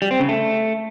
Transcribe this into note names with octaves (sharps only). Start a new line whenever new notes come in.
G3
C4
C#3
A3